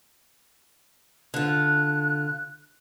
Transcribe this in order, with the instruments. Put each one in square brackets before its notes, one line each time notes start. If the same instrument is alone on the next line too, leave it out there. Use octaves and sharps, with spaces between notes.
[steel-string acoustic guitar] D3 F4 [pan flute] F#6